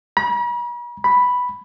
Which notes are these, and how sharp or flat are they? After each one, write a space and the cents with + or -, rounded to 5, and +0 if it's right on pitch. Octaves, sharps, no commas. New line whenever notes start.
B5 -45
B5 +0